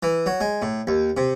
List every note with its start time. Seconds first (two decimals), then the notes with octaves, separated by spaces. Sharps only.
0.03 E3
0.26 F#3
0.41 G#3
0.62 A2
0.87 D#2
1.17 C3